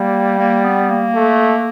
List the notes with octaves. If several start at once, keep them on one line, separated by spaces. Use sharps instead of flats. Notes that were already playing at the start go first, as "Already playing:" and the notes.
Already playing: G3 A#3
A#3
B3
A#3
A3